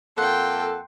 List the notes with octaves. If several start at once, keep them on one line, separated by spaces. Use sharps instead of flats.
F2 A#3 A4 F#5 G5 C6